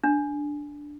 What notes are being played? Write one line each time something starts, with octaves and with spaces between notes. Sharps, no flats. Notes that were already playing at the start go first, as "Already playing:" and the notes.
D4